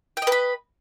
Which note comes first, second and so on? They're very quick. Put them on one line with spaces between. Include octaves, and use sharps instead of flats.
G5 D#5 B4 B5